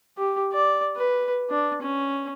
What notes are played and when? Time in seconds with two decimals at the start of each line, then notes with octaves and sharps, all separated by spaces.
0.18 G4
0.53 D5
0.96 B4
1.50 D4
1.81 C#4